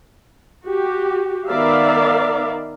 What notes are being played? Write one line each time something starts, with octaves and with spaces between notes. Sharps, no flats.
F#4 G4
D#3 B3 A#4 D5 E5 F5